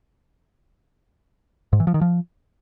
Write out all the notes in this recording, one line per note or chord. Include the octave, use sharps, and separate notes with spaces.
G#2
E3
F3
D#3
F3